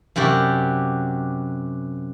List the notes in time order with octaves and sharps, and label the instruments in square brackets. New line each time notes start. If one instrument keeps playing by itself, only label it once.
[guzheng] F#2 C3 F#4 G4 D5